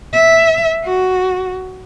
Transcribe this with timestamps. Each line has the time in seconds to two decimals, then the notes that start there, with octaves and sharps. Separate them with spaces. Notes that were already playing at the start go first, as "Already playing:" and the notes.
0.13 E5
0.85 F#4